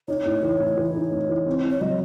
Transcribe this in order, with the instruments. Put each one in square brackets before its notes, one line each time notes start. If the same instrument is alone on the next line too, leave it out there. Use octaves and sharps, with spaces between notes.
[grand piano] D#4 [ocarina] C#5
[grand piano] A2
E3
A2
E3
D#4
A2
E3
C4
C4
[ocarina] C#5
[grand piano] F#3 [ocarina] D#5